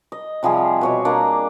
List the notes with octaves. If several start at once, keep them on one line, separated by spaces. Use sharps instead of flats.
D#5
C3 F3 G3 G#4
B2 C#5 D6
A#3 D4 D5 A#5